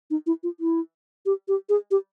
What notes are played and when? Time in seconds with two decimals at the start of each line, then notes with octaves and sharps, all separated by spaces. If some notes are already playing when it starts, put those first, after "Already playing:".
0.10 D#4
0.27 E4
0.43 F4
0.60 E4
1.26 G4
1.48 G4
1.69 G#4
1.91 G4